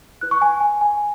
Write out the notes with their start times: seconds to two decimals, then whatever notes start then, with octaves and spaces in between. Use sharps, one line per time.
0.21 E4 B4 F#6
0.31 C#6
0.41 G#5
0.60 G#5
0.81 G#5